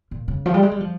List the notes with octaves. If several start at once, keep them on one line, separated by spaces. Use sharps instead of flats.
A#2
C#3
F3
G3
G#3
G3
F3